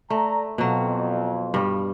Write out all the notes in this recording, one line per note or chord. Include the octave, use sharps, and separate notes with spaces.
A3 D5 E5 A#5
F2 B2 F#3
G2 G3